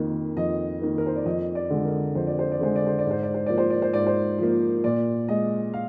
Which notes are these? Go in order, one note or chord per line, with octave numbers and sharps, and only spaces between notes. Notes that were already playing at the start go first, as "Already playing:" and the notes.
Already playing: F2 D#3 A#3
F2 D#5
D#3 A#3
A#4
C5
D5
F2 D#5
D5
D3 G#3
A#4
F2 C5
D5
C5
D5
D3 G#3 C5
D5
C5
D5
G#2
C5
D5
C5
F3 A#3 D5
C5
D5
C5
G#2 D5
C5
F3 A#3
A#2 D5
G#3 D#5
F5